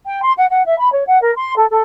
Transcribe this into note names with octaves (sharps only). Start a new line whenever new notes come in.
G5
C6
F#5
F#5
E5
B5
C#5
F#5
A#4
C6
A4
A4